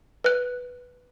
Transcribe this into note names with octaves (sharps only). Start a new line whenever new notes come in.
B4 F#6